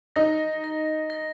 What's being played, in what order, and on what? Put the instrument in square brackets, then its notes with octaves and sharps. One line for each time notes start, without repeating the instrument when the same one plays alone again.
[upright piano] D#4 [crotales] A#6
[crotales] A#6
A#6